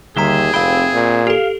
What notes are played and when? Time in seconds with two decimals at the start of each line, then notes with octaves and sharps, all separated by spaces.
0.17 D#2 D3 G3 G4 G#4 E5 A#5
0.54 F1 C4 E5 F5 G5 B5
0.94 A#2
1.27 G4 A4 F5